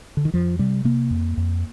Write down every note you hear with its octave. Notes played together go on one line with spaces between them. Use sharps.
D3
D#3
F2 F3
C3 G3
C3 A#3
F2
F2